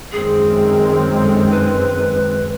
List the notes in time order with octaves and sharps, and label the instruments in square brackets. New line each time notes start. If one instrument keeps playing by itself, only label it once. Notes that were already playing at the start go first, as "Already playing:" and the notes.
[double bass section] F#2 D#3 G#3 C4 [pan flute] G#4
[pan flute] A4
B4